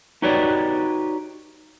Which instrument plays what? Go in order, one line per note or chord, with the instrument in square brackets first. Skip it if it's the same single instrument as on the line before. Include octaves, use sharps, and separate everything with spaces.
[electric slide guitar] D#4 F#4 G4 B4 C#5 D5